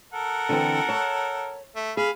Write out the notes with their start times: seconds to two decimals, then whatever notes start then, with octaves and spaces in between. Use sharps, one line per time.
0.13 A4 A#4 F#5
0.49 D3 E3 C4
0.89 C#5 A5
1.76 A3
1.97 G#4 F5 B5